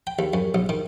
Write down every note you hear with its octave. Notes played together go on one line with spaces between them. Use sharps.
G5
D#2
F#2
B1
D#3